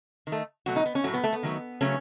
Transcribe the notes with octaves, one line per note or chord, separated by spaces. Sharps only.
D#3
A3
B2 F#3 A3 F#4
D#4
B3
C#4
A2 F#3 A3 F#4
B3
A3
B3
D#3 F#3 A3
C#3 F#3 A3 C#4